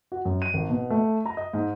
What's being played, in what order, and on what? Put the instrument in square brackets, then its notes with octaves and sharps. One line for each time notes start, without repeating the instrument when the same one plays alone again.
[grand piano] F#4
F#2
D#7
G#1
B2
A3
A#5
D#5
G#2